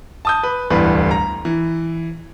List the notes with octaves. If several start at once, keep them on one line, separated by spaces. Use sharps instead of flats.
A5 D#6 G6
B4
D1 G1 E2 G3 B4
A#5
E3